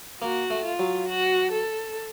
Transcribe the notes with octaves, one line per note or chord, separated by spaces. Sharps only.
A#3 F#4
A3
F4
F#3
F#4
A4